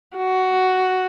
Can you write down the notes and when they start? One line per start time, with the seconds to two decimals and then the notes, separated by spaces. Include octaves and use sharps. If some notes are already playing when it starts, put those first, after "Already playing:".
0.16 F#4